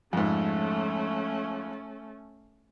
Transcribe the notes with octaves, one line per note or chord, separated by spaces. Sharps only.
F2 G#2 A3 C#4